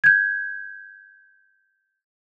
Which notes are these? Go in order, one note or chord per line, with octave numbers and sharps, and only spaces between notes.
G6 G#6